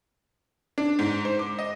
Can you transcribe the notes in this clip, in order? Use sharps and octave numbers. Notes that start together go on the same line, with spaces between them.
D4
G#2
C5
D6
D#5